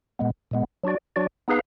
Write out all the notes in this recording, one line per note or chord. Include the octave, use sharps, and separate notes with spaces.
A#2 G#3 B3
A#2 G#3 B3
F#3 D4 F#4 D5
F#3 D4 F#4 D5
B3 D#4 G#4 B4 F5